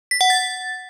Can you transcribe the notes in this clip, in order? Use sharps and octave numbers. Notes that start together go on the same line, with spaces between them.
B6
F#5
A6